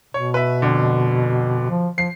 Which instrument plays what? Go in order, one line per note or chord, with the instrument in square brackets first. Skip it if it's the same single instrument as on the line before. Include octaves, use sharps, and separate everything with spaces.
[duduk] B2 [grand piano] C#5
[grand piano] B4 E5
F2 D3
[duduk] F3
[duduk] F3 [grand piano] C7